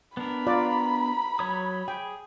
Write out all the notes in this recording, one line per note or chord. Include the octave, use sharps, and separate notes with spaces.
B3 D4 A#4 B5
F4 D5 A#5
F#3 C#5 D#6
G#4 G5